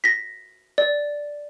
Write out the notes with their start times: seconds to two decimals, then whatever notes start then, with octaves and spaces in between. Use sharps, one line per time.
0.04 A#6 B6
0.78 D5